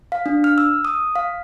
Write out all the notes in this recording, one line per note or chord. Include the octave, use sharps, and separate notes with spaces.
F5
D4
F6
E6
D#6
F5